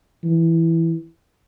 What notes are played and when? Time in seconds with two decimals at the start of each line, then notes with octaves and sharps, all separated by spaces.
0.24 E3